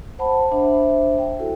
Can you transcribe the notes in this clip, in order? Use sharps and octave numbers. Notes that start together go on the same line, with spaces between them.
C5 F#5 A5 B5
D4 C5 E5
G5
E4 F#4 A4